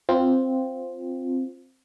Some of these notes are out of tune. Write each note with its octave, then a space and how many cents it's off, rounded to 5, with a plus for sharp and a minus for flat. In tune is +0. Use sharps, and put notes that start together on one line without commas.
C4 +0 F4 +5